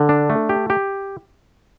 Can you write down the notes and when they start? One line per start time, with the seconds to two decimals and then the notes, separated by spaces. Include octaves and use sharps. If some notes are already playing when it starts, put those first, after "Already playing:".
Already playing: D3
0.09 D4
0.30 A3
0.49 G4
0.70 G4